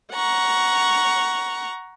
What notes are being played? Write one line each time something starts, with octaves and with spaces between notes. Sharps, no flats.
F#5 A#5 C#6